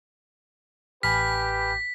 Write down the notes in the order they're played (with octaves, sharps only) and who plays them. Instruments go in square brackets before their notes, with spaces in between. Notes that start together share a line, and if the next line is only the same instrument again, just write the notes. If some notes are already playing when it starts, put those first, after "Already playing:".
[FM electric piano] A1 [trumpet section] G4 B4 [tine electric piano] G#5 B5 F6 [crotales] B6